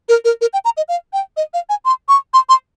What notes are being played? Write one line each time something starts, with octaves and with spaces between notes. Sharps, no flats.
A#4
A#4
A#4
G5
A#5
D#5
F5
G5
D#5
F5
G#5
C6
C#6
C6
C6